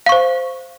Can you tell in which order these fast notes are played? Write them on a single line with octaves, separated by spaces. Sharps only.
F5 C#6 C5